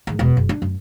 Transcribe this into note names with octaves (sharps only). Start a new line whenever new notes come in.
G#2 D#3
E1 B2
F#1
D4
F#2